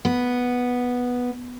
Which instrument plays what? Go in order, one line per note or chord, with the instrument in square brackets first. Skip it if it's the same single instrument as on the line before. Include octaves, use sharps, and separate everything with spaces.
[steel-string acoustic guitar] B3